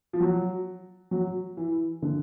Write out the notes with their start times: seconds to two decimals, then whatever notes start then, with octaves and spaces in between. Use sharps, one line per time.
0.13 F3
0.20 F#3
1.11 F#3
1.57 E3
2.02 D3